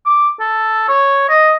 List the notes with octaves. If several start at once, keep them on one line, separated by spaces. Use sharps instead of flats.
D6
A4
C#5
D#5